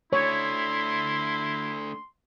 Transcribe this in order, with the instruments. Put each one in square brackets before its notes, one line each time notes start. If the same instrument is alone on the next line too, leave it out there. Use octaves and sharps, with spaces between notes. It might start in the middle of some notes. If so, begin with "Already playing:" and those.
[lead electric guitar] A3 D4 [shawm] E4 [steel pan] C#5 [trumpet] C6